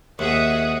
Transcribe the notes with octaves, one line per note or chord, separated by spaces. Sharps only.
D#2 F#4 G#4 E5 F#5 D#6